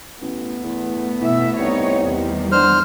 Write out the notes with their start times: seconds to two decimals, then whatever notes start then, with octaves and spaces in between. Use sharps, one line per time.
0.22 A1 A3 B3
0.63 E2
1.21 B2 E3 E5
1.58 C2 D#4 C#5
2.04 E2 D#3 G3
2.52 D3 C5 F6